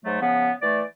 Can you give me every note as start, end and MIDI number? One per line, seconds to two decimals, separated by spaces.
0.05 0.22 44
0.05 0.22 54
0.05 0.22 57
0.22 0.51 49
0.22 0.51 53
0.22 0.51 59
0.62 0.83 52
0.62 0.83 57
0.62 0.83 74